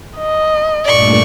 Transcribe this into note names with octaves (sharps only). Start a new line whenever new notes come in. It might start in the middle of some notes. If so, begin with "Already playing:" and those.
D#5
G2 A#2 A3 D5 C#6